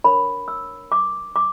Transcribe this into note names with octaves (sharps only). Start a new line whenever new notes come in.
D4 A#4 C#5 B5
E6
D6
D6